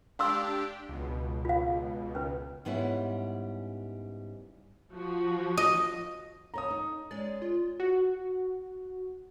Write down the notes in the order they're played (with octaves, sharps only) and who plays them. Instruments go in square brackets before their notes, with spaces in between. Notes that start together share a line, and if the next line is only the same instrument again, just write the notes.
[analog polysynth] D4 G4 [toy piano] F5 C6 E6
[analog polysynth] C#2 B2
[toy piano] F4 F5
C#4 B4
[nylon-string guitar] G#2 G3 B3 C#4 E4
[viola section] F3 F#4
[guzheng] D#5
[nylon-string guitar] A4 C#5 [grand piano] A#5 D#6
[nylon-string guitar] D#4
[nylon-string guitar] G#3 C#4 [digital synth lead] D5
[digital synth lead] F4
[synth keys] F#4